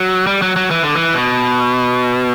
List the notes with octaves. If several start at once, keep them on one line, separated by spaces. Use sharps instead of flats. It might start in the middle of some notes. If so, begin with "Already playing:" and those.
Already playing: F#3
G3
F#3
F#3
E3
D3
E3
B2